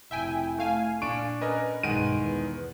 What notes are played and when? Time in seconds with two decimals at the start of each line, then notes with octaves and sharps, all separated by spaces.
0.11 F1 E4 E5 G5 G#5
0.58 A3 F5 G#5
1.02 A#2 D4 C#6 D7
1.41 C#4 A#4 B4 D#5 G#5
1.83 B1 G2 D#3 G#3 F#5 G#5 D7 D#7
2.15 E2